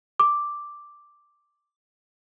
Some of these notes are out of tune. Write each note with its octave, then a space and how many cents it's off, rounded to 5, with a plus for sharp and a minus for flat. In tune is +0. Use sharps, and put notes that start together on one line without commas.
D6 +0